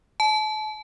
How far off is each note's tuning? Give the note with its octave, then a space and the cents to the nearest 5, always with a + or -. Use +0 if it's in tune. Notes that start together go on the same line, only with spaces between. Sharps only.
A5 -40